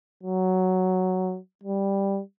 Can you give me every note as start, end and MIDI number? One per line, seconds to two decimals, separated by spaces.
0.23 1.38 54
1.63 2.20 55